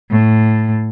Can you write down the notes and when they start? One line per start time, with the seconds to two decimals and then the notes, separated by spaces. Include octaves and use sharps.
0.11 A2